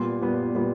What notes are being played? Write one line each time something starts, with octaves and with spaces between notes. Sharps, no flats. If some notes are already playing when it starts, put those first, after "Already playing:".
Already playing: A#2 G3 B3 C6
A#2 G3 B3
A#2 G3 B3